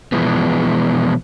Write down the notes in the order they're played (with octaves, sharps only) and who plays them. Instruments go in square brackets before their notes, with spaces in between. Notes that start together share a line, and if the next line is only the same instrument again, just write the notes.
[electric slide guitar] B2 E3 F3 G#3 B3